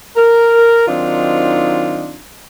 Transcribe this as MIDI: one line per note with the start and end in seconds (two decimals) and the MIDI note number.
0.17 0.86 70
0.88 2.19 51
0.88 2.19 54
0.88 2.19 60
0.88 2.19 62
0.88 2.19 63
0.88 2.19 65